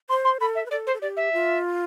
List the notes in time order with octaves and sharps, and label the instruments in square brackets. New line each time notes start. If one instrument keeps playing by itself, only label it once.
[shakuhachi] C5 [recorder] C6
[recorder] C6
[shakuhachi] A4 [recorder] B5
[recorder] E5
[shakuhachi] B4
[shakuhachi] A4 [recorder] D5
[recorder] C5
[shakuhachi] A4
[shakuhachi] G4 [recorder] D5
[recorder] E5
[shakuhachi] F4